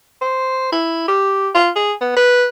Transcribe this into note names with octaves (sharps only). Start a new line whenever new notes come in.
C5
E4
G4
F4
G#4
B3
B4